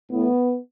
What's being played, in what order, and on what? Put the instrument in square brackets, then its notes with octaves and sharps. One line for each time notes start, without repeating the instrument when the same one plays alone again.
[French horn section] A2 E3 B3